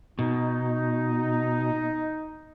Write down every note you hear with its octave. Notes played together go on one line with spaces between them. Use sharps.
B2 D#4